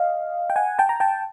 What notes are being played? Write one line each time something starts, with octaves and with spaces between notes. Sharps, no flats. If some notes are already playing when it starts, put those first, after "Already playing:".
Already playing: D#5 F5
G5
F#5 G#5
G5 A5
A#5
G5 A5